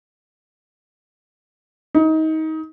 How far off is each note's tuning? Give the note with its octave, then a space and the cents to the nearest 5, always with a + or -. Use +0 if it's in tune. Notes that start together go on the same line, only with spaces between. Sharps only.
D#4 +25